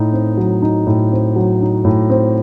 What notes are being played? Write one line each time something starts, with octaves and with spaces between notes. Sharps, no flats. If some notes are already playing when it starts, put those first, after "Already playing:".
Already playing: A2 D#4
C4
F#3
D#4
A2
C4
F#3
D#4
A2
C4